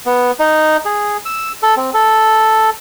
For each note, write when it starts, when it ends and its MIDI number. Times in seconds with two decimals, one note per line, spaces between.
0.06 0.31 59
0.40 0.77 63
0.85 1.17 68
1.25 1.52 88
1.63 1.75 69
1.77 1.90 60
1.94 2.70 69